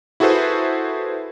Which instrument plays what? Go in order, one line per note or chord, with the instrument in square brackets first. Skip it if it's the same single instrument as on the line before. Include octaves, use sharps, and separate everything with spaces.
[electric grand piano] E4 F#4 G#4 A4 B4 C5